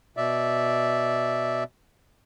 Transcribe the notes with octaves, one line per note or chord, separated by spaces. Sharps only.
B2 D5 E5